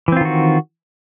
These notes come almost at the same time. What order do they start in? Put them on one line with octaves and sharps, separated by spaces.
E3 C4 F4 D#3 F#4